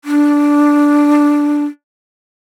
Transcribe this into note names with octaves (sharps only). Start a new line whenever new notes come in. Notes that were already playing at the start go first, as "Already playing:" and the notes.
D4